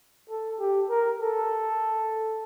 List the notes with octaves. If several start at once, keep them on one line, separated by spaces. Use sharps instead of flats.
A4
G4
A#4
A4